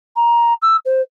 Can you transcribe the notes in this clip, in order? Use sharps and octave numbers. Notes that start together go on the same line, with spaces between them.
A#5
E6
C5